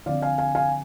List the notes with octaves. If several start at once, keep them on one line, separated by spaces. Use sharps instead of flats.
D3 F3 C4 D5 F5
F5 G#5
F5 G#5
F5 G#5